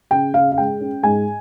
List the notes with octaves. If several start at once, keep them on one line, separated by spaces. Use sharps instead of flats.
C#3 G5
C#3 F5
F5
G#3 G5
C#4
G#2 G#5